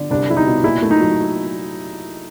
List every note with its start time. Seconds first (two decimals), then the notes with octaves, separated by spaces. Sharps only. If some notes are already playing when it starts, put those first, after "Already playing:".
Already playing: D3
0.10 C2 D4
0.29 G3 E4
0.37 D#4
0.46 B2
0.63 A#2 E4
0.82 A3
0.91 D#4
1.00 F#3